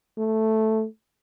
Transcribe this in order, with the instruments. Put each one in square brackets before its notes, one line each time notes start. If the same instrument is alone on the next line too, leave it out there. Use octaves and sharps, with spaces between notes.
[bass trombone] A3